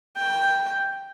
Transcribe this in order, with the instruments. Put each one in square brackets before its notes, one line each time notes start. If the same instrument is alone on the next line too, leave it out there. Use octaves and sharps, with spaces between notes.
[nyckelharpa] G5